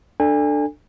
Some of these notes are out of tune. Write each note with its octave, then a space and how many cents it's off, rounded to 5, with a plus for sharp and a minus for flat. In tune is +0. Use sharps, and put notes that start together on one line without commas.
D4 +10 A4 +10 G#5 -35